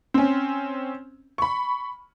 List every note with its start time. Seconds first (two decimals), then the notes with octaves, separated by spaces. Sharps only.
0.14 C4 C#4
1.38 B5 C#6